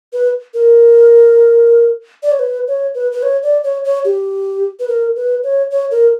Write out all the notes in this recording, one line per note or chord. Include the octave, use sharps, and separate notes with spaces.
B4
A#4
D5
C#5
B4
C#5
B4
B4
C#5
D5
C#5
C#5
G4
B4
A#4
B4
C#5
C#5
A#4